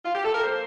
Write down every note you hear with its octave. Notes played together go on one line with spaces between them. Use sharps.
F4
G4
A4
A#4
F3 A#3 C5